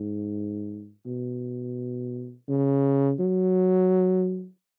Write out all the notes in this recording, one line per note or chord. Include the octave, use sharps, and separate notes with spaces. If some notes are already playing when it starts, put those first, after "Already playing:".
Already playing: G#2
B2
C#3
F#3